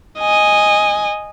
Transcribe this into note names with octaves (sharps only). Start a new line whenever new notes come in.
D#5 G#5